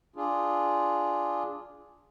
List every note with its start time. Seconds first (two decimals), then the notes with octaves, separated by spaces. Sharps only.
0.16 D4 F4 G#4